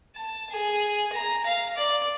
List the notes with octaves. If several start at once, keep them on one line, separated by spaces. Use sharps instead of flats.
A5
G#4
A#5
F5
D5